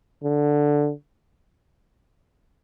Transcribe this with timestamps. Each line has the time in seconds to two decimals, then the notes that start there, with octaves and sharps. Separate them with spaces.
0.23 D3